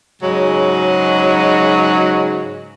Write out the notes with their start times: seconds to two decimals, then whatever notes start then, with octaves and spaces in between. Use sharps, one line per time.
0.22 G#2 C#3 F#3 G#3